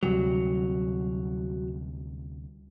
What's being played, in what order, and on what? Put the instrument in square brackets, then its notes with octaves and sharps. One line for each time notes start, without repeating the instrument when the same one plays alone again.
[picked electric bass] D2 C3 G3 [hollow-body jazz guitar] F#3